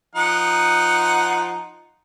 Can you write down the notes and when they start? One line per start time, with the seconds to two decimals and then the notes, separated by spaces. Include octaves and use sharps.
0.15 F3 D#4 F#5